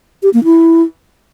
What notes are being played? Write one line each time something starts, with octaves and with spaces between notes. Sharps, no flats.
G4
A#3
E4